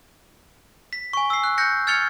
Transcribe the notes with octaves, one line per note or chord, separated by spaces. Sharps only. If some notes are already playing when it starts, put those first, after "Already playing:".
B6
G#5 C#6
E6 C7
F#6
F#6 G6 A#6 C#7
F6 G#6 A6 C#7 F7 G7